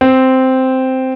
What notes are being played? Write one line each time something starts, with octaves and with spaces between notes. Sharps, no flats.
C4